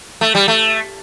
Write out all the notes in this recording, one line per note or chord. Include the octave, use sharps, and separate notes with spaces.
A3
G3
A3